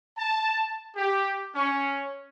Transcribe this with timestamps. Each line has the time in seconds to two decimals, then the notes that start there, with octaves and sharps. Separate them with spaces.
0.17 A5
0.96 G4
1.55 C#4